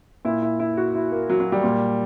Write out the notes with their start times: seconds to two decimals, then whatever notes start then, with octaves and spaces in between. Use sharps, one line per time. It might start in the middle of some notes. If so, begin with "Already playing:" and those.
0.25 A#2 E4
0.42 E4
0.60 E4
0.77 F#4
0.95 E4
1.12 A#3
1.30 F#3
1.40 F#3
1.52 G3
1.63 A#2